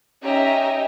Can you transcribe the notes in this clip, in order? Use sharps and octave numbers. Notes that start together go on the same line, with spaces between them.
C#4 D#4 G4 D#5 E5 A#5